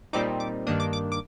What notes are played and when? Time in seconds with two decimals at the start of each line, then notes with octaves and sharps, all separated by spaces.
0.13 A#2 G3 C4 D#4 D6
0.40 D6
0.67 G2 D#3 A#3 D4 D#6
0.80 D6
0.93 D6
1.12 D6